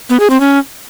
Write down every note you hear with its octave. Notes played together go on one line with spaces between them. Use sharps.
B3
G#4
C4
C#4